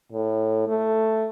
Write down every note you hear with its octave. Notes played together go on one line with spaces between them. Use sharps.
A2
A3